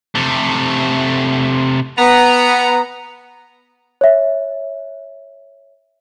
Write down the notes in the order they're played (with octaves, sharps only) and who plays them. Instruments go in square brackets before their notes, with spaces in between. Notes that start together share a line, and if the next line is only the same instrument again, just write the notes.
[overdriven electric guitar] C3 A3
[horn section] B3 [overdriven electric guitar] A#5
[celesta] C#5 E5